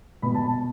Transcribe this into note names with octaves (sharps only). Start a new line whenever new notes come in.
B2 B5
A5
A5